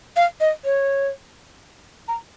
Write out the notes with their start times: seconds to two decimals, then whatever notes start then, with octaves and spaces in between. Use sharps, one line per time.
0.16 F5
0.41 D#5
0.65 C#5
2.08 A#5